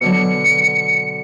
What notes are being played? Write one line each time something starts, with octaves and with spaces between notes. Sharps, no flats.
B2 D3 F#3 C#7